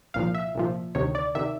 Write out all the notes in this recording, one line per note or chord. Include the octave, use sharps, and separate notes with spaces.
C2 A#2 F3 F5
E5
C2 A#2 F3
D2 C3 D#3 C#5
D5
C3 D#3 E5